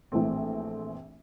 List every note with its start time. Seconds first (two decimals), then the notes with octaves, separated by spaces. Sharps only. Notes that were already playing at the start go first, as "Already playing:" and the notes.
0.12 A#1 A2 E3 A3 C4